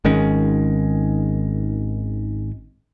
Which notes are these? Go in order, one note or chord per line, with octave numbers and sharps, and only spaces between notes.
G#1 D#3 G#3 C#4